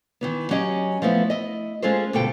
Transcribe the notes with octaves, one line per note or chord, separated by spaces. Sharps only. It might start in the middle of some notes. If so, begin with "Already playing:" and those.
D#3 E3 B3
F#3 C#4 G4 D#5
F3 A3 B3 E4
E4 D#5
G#3 C#4 F4 G#4 A4 C5
D2 G2 B2 F4 A4 G5